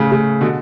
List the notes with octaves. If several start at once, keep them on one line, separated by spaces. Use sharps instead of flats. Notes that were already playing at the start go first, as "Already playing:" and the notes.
Already playing: A2 C#3
A2 C#3
B2 D3